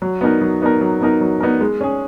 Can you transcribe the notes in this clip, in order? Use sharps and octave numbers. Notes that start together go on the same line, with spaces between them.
F#3
B3 D#4 A#4
F#3
B3 D#4 A#4
F#3
B3 D#4 A#4
F#3
B3 D#4 A#4
G#3
C#4 G#4